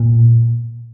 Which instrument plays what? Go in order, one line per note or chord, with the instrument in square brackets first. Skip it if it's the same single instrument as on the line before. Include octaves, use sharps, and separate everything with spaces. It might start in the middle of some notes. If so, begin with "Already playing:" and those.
Already playing: [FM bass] A#2